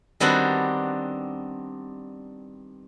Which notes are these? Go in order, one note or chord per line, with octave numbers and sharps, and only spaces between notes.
D#3 G3 B3 C4 D4 F#4